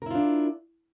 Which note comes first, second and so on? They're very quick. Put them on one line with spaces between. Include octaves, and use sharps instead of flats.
A#4 E4 F4 D4